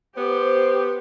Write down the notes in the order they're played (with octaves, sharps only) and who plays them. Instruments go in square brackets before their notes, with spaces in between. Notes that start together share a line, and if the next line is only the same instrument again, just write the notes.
[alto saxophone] B3 [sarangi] G4 [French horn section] C5